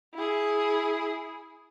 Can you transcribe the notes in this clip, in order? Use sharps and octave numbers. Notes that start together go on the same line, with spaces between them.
E4 G#4